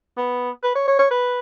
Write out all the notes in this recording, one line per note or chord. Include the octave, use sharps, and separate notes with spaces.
B3
B4
C#5
C#5
C#5
B4